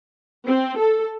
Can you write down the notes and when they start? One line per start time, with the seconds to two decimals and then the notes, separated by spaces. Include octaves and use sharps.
0.47 C4
0.78 A4